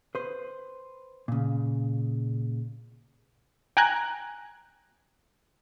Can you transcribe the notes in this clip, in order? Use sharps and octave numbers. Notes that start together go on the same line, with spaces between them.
B4 C5
A#2 C#3
G5 G#5 A#5 F#6 G#6